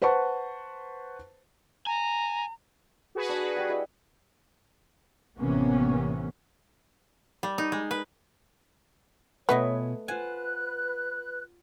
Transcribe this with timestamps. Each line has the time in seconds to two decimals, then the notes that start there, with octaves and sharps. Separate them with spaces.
0.02 B4 C5 F#5 A5 C#6
1.87 G#5 A#5
3.15 F#4 G#4 B4
3.29 D4
3.57 G3 F#5
3.69 E4 D#5 E6
5.37 A1 C3 E3 A#3 B3 C#4
7.43 G3
7.58 D#4
7.72 G#3
7.91 B4
9.49 B2 A3 B3 F4 B4 C#5 D#5 G#5
10.08 F4 B4 C5 F#5 G#5 F#6